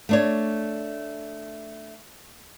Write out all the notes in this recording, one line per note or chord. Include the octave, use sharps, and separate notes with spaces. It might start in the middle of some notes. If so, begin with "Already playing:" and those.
A3 D4 C#5